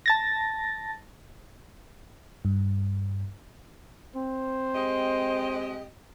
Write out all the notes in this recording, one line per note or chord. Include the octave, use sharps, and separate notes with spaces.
A5 A6 A#6
G2
C4 C5
G#3 G4 D#5